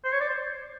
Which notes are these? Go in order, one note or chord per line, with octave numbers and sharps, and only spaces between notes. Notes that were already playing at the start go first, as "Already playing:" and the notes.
C5
C#5
D5
C5